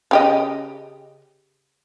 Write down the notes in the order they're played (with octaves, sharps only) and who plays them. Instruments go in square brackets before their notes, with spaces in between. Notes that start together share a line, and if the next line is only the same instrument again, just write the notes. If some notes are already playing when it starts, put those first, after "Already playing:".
[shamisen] C#3 G4 D#5